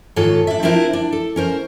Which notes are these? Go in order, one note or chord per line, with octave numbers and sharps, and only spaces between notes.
G#2 D#3 F4 A4 C#5
D4 E5
C4 D4 E4 F4 A#4 C5
D4
A4
C#4 A#4 C5